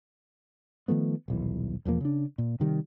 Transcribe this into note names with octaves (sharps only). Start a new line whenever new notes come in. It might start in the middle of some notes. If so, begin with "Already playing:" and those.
D#3 F3 A3 B3
D#1 B1 E3
E1 E2 F3 A#3
C#3 D4
A#2
C3 D#3 G3